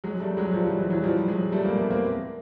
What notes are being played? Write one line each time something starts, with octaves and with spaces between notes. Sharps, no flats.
F#3 G#3
G3 A3
F#3 G#3
F3 G3
E3 F#3
E3 F#3
E3 F#3
F3 G3
F#3 G#3
G3 A3
G#3 A#3
A3 B3
A#3 C4